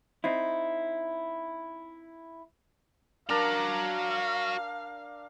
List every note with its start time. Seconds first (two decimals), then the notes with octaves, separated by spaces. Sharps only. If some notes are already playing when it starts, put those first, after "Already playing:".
0.24 C4 D#4 E4
3.30 D4 F#4 A#4 F5 A#5